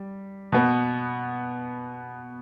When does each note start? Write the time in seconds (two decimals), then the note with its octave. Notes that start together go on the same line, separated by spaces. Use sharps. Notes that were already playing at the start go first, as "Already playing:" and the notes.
Already playing: G3
0.52 B2 B3